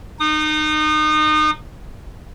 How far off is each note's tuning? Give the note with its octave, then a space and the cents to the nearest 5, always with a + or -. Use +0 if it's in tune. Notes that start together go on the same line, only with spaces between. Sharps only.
D#4 -25 D#6 -30